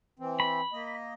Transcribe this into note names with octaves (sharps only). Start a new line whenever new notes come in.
E3 C4
B5
A#3 D#5